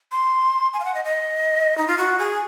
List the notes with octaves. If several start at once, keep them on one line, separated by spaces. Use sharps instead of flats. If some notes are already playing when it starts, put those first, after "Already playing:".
C6
G#5
F5
F#5
D#5
D#5
D#4
F4
F#4
G#4